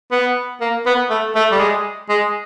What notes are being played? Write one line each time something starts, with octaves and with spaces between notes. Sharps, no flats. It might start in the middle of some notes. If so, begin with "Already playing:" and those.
B3
A#3
B3
A3
A3
G3
G#3
G#3